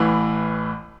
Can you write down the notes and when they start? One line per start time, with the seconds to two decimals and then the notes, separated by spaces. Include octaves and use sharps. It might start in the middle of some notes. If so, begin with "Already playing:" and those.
Already playing: A1 A2 E3